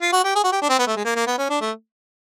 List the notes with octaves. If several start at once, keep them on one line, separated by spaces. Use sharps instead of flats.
F4
F#4
G4
G#4
F#4
G4
D4
C4
B3
A3
G#3
A#3
A#3
B3
C#4
D4
A3